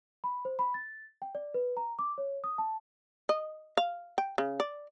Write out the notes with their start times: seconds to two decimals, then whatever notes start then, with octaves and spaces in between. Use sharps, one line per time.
0.24 B5
0.45 C5
0.59 B5
0.74 A6
1.22 G5
1.35 D5
1.54 B4
1.77 A#5
1.99 D6
2.18 C#5
2.44 D#6
2.58 A5
3.29 D#5
3.77 F5
4.18 G5
4.38 C#3
4.60 D5